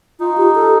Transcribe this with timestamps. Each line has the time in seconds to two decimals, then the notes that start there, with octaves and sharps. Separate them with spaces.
0.20 D#4 F4
0.37 G4
0.55 A4